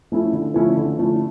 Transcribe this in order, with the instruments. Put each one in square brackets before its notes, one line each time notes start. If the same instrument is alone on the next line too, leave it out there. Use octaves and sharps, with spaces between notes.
[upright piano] F3 A3 C#4 E4
D3
F3 A3 C#4 E4
D3
F3 A3 C#4 E4